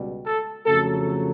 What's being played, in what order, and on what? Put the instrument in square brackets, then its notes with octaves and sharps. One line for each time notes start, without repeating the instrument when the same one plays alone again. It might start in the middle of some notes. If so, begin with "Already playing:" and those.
Already playing: [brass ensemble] C#2 B2 G3
A4
F2 C#3 F#3 A3 A4